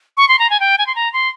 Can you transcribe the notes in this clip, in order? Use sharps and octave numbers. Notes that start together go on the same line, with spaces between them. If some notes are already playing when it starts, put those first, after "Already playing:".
C#6
C6
A#5
G#5
G5
G#5
C6
A#5
C6